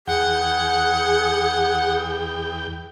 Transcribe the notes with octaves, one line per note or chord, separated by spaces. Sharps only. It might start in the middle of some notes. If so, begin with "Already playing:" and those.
E2 G#4 F#5 G5